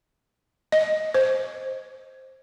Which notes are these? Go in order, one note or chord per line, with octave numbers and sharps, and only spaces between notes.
D#5
C5